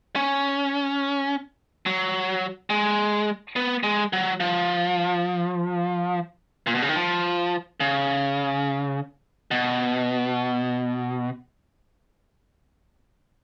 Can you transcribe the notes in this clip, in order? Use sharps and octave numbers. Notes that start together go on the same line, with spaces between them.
C#4
F#3
G#3
B3
G#3
F#3
F3
A#2
B2
C#3
D#3
F3
C#3
B2